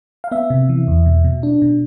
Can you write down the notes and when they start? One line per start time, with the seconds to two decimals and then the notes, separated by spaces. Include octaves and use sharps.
0.24 F5
0.31 B3 E5
0.50 C3
0.69 E3
0.88 E2
1.06 B2
1.24 B2
1.43 D4
1.62 B2